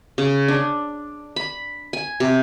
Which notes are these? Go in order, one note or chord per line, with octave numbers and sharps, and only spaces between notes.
C#3
D4
B5
G#5
C3